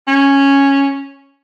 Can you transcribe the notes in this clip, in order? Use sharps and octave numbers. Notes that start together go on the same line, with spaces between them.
C#4